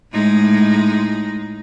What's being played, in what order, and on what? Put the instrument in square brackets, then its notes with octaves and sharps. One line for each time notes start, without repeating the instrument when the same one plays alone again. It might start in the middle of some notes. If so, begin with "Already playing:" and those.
[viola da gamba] A2 G#3 D#4